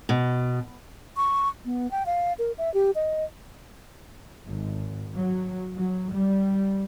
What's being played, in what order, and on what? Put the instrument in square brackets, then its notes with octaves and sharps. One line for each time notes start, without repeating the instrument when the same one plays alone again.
[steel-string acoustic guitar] B2
[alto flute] C#6
B3
G5
F5
A#4
E5
G4
D#5
[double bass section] G#1
F#3
F#3
G3